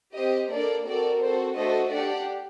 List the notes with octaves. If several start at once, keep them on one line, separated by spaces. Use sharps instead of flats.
C4 G4 C5 D#5
A#3 D4 A4 A#4 D5
C4 F#4 A4 A#4 D5
C4 F#4 A4 C5
A3 D4 F#4 A4 C5 D#5
D4 G4 D5 F#5